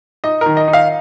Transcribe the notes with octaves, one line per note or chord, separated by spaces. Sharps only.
D#4 D#5
D#3 A#4
D#5
D#4
F5